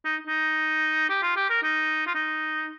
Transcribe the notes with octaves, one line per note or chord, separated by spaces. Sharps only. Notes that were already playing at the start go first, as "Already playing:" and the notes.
D#4
D#4
G4
F4
G4
A#4
D#4
F4
D#4